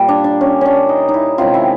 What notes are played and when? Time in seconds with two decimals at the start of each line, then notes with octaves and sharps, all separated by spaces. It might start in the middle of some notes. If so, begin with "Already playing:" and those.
Already playing: A#2 G3 A#3
0.09 D4
0.24 D4
0.41 C#4
0.61 C#4 D4
0.89 D#4
1.09 D#4
1.14 E4
1.38 C3 D#3 G#3 C#4 F4
1.54 E4